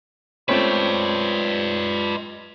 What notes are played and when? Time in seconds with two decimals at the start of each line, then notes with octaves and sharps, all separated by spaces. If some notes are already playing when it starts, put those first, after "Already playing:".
0.49 G#3 A3 C4 C#4 F4 B4 D5